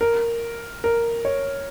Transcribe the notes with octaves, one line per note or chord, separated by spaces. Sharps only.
A#4
A#4
C#5